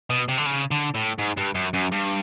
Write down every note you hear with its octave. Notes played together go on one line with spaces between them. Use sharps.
B2
C3
D3
C#3
D3
A2
G#2
G2
F#2
F#2
G2